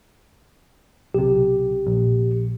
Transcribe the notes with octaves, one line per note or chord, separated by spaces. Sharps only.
B1 C3 G4
A#1